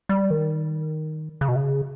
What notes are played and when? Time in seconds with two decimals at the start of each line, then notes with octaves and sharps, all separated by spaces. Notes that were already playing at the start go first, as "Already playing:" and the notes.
0.09 G3
0.31 D#3
1.41 C#3
1.48 B2
1.56 C#3